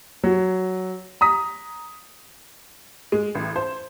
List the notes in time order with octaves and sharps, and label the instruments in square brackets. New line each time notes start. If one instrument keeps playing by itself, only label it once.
[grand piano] F#3
A#5 D#6 B6
[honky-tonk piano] G#3
A1
C5